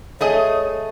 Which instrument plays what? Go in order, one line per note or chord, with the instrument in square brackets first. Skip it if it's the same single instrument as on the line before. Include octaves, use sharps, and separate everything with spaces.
[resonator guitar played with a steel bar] A3 G#4 D#5 [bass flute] C#5